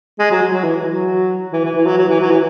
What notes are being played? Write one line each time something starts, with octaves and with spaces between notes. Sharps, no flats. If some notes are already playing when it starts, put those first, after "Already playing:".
G#3
F#3
F#3
F#3
E3
F#3
E3
E3
E3
F#3
F#3
E3
F#3
E3